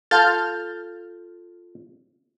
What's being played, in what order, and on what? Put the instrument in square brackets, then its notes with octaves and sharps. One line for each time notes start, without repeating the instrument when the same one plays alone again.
[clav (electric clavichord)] F4 A4 [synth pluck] F6 G6 A6